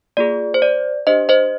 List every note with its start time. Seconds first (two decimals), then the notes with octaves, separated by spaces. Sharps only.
0.17 A#3 F4 G#4 D5
0.54 C5
0.62 D5
1.07 D4 G4 C5 D#5
1.29 C5 D#5